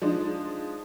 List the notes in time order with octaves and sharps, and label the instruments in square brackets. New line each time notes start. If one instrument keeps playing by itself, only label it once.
[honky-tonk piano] F3 G#3 D4 D#4